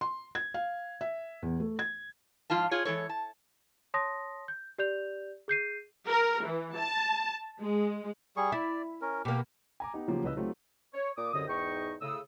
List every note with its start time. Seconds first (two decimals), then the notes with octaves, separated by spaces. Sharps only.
0.01 C6
0.35 G#6
0.54 F5
1.01 E5
1.42 E2
1.60 A3
1.79 G#6
2.50 G#2 F3 F4 F5 A5
2.71 F4 G#4 C#5
2.85 E3 G#3 A4 C#5
3.09 A5
3.94 C#5 A5 C6 D#6 A#6
4.48 G6
4.78 G4 D5 G6 F7
5.48 G#4 G6 C7 D#7
6.07 A#4
6.44 E3
6.75 A5
7.60 G#3
8.37 G3 G#4 C#6
8.52 E4 D5
9.01 C#4 A#4
9.25 B2 A#3 G4
9.80 G#5 A#5 D6
9.94 B3 D#4 G4
10.08 C#3 F3 F#3 A#3 F4 G4
10.23 C2 C#3 B4 D#5 E6
10.37 F#3 A3 C4 D#4 F4 G4
10.94 C#5
11.17 A#2 D6 D#6
11.32 C2 F#2 D3 D#5 D#6
11.48 E2 G#2 D#4 D#5 G5 C#6
12.01 A2 C#3 D#6 E6